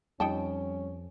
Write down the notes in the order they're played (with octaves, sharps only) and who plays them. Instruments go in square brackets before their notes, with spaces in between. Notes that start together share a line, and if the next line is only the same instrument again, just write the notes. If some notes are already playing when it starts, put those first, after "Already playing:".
[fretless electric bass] F2 [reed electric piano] G3 [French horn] C#4 [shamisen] D#4 G5 A5